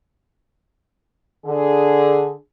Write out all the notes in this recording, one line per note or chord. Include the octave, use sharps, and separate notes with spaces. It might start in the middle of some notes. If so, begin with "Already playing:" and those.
D3 G#4